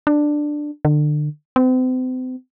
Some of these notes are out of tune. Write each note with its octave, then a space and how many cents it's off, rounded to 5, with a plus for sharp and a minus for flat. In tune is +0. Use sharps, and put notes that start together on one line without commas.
D4 +10
D3 +30
C4 -40